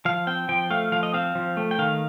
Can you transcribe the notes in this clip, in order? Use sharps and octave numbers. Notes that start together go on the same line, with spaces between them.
F3 F5
C4 G5
F3 G5
A3 F5
F3 F5
D#5
C4 F5
F3
A3
G5
D#3 F5